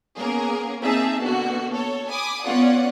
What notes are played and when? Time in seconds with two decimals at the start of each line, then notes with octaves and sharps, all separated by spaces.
0.18 A#3 B3 C#4 G#4 A#4
0.83 A#3 C4 D#4 G#4 E5 A5
1.23 B2 D3 A#3 B3 F#4
1.73 A4 C#5
2.10 G#5 B5 D6 D#6
2.43 B3 C#4 F4 D5 F#5